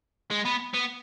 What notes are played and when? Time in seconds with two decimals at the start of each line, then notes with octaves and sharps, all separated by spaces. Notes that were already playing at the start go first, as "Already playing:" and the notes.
0.31 G#3
0.45 B3
0.74 B3